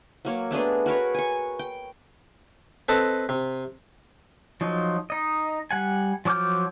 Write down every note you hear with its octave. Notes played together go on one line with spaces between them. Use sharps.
F#3 A#3 C#5
A3 B3 D4 G#4
F#4 A#4 B4 C#5
G#5 C#6
G5
C4 A4 B4 D#5 A5
C3
F3 F#3 D#4
D#4 D#5
G3 F#5 G#5
F3 F#3 D6 F6 G6